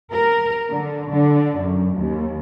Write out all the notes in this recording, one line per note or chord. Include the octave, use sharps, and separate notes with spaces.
A#4
D3
D3
F#2
D#2